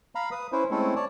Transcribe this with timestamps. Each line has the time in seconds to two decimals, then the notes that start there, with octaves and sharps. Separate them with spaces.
0.15 F5 A#5 B5
0.31 B4 D#6
0.52 C#4 E4 B4 C5
0.71 G#3 A3 C4 C#4 E4 A4
0.96 C#5 D5 A5